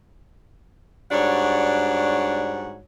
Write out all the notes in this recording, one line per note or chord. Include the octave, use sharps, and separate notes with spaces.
G#2 G3 D4 F#4 C#5 F#5